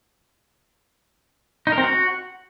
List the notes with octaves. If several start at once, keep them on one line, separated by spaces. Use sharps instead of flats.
D#4
A#4
C4
F#4